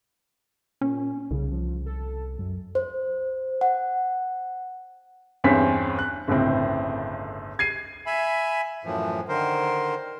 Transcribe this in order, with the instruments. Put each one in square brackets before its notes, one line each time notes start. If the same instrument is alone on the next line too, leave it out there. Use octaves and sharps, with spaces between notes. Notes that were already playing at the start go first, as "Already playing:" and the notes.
[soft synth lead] A#2 [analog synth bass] C#4
[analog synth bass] C2 [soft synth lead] C#3
[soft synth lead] F3
A4
F#2
[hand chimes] C5
F#5
[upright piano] E2 G2 C4 C#4 B6
F#6
G1 C#2 A2 C4
G#6 C7 D#7
[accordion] E5 G#5 B5
F#2 A2 E3 F3
D3 D#3 A#4 C5